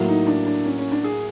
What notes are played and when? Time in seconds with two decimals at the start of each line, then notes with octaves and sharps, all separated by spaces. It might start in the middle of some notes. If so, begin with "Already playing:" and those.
Already playing: A2 F#3 A#3
0.08 D#4
0.27 D4
0.46 D4
0.65 C#4
0.78 C#4
0.92 D4
1.04 G#4